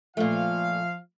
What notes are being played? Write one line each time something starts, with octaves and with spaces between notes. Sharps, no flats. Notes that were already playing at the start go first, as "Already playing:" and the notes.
A#2 F3 A3 F5